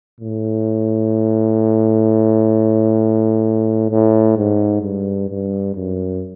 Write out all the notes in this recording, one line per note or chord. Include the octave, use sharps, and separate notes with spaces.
A2
A2
G#2
G2
G2
F#2